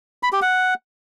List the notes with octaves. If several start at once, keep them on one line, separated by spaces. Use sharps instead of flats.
B5
G4
F#5